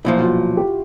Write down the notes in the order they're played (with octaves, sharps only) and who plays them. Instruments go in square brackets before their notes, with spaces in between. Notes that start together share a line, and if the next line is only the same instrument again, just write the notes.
[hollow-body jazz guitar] B1 A#2 F3 [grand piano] E4
[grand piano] F#4
F4
G4